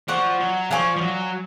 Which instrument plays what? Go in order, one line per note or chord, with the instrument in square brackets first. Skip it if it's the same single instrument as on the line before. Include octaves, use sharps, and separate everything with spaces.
[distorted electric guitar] F3 [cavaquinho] D5 F#5 C#6
[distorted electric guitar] F#3
[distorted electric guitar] F3 [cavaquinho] D5 F5 G#5 C#6
[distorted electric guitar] F3
F#3